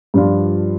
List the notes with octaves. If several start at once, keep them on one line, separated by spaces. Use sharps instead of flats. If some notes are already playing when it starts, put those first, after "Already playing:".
G2 F3 D4 F4